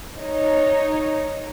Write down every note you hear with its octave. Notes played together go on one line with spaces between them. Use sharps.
D#4 C#5